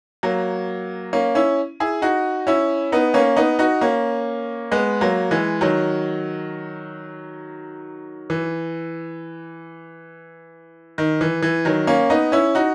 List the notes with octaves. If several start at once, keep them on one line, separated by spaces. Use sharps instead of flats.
F#3 A#3
A#3 C#4
C#4 E4
E4 G#4
D#4 F#4
C#4 E4
B3 D#4
A#3 C#4
B3 D#4
D#4 F#4
A#3 C#4
G#3 B3
F#3 A#3
E3 G#3
D#3 F#3
E3
D#3
E3
E3
D#3 F#3
A#3 C#4
B3 D#4
C#4 E4
D#4 F#4